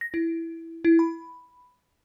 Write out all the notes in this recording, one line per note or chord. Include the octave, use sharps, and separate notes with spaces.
A#6
E4
E4
B5